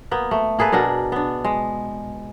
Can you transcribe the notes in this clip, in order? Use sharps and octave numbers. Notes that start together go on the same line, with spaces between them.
A#3 B3
A3
A#3 G#4 A4 B4
B2 D4 A#4 F#5
B3 D4
G#3